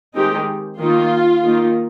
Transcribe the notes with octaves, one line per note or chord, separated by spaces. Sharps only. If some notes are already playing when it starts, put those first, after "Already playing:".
D#3 G#3 C4 D#4 G4
D#3 A#3 D#4 F4
D#3 A#3 D#4